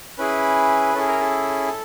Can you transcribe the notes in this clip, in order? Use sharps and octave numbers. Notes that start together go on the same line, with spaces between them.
C#4 E4 G#4 B4
C#4 E4 G#4 A4
A#4
A4